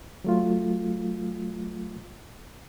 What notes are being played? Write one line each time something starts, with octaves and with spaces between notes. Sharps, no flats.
F#3 A3 F4